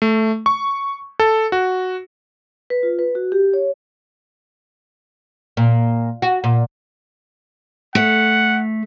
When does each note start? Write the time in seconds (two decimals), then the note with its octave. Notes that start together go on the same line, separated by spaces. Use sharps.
0.02 A3
0.46 C#6
1.20 A4
1.52 F#4
2.70 B4
2.83 F4
2.99 B4
3.15 F#4
3.32 G4
3.54 C#5
5.57 A#2
6.22 F#4
6.44 A#2
7.95 A3 F#5